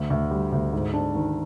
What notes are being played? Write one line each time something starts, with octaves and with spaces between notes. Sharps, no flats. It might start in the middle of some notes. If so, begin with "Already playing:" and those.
Already playing: D2
D2
G3
D2
G#2
D4
D#3